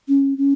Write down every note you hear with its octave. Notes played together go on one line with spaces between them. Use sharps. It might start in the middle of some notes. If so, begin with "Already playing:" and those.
C#4
C#4